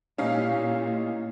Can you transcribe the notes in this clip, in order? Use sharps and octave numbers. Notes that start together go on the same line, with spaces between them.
A#2 C#4 D#4 E4 G4 C#5 F5